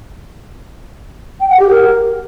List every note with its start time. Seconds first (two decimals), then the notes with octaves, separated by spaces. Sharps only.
1.40 G5
1.50 F#5
1.60 G4
1.69 A#4